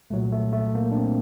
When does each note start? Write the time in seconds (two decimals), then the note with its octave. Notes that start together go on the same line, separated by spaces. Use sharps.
0.10 C2 A#2 F#3 A3
0.32 A3
0.53 A3
0.75 A#3
0.91 D4
0.97 C4